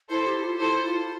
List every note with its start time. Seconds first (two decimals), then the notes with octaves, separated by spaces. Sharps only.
0.10 E4 A4 C5
0.27 G4
0.44 F4
0.60 E4 A4 C5
0.85 F4